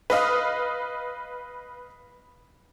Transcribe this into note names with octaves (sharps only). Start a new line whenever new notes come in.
B4 D#5 F5 D#6